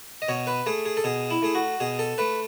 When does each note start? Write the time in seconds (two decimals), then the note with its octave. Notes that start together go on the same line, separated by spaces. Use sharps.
0.22 D#5
0.28 B2 C#5
0.47 B4
0.66 A3 G#4
0.86 G#4
0.97 A4
1.04 B2 G#4
1.30 E4
1.42 A3 G#4
1.55 F#4
1.80 B2 G#4
1.99 A4
2.18 A3 B4